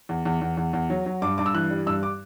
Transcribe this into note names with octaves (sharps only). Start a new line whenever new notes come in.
E2
E2
E2
E2
E2
F#3
F#3
G2 D6
G2 D6
E6
E3 F#6
G3
G2 E6
D6